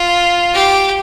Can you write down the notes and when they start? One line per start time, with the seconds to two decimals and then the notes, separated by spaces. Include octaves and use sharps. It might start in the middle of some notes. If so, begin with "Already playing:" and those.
Already playing: F4
0.53 G4